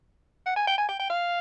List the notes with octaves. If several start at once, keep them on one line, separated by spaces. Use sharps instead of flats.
F#5
G#5
G5
G#5
G5
G5
F5